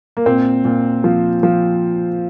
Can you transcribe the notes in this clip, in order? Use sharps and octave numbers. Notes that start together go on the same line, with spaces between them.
A#3
A#2 C4
A#2
F3
F3